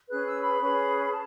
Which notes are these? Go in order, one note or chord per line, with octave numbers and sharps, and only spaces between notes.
C#4 G#4 B4 F#6
E6
B5
C#4 G#4 B4
A5